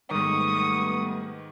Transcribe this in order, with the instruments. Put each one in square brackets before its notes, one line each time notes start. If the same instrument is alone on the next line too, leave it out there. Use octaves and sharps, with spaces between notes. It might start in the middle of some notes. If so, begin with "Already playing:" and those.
[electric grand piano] G#2 D#3 [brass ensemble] G3 A3 B3 [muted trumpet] C#6 [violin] D#6